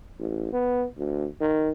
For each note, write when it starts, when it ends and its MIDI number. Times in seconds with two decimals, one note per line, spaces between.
0.20 0.48 33
0.53 0.86 59
0.98 1.27 38
1.41 1.71 51